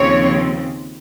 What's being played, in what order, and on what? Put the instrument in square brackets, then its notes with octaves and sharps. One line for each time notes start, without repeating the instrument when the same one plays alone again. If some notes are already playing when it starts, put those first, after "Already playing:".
Already playing: [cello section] D#2 C#3 F3 C4 C#5